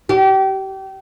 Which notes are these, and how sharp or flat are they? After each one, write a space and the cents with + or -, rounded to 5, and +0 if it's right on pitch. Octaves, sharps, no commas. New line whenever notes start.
G4 -30